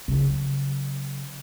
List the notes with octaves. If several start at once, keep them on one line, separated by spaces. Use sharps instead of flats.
C#3 F#3